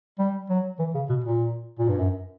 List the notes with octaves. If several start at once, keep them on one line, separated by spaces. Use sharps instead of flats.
G3
F#3
E3
C#3
B2
A#2
A#2
G2
F#2